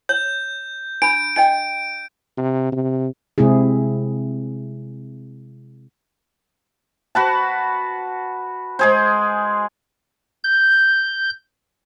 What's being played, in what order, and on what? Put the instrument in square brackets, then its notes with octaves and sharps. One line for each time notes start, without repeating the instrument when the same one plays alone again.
[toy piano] C#5 [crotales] G6
[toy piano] D4 B5 [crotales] D7
[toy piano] D4 D#5 G5 [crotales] D7
[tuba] C3
C3
[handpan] C3 G#3 C4 E4 G#4
[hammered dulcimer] F#4 B4 A5
G#3 G#4 C5
[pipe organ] G6